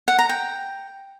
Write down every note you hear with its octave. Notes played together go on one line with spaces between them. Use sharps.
F#5
A#5
G5